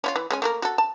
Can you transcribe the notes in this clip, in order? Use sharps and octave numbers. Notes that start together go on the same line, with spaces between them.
C#4 E4 F4
E3
G#3 C#4 G#5
A3 A#3 A#4
F#4 A4
A5